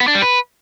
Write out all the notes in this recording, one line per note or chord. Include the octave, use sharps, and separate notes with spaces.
B3
D4
G3
B4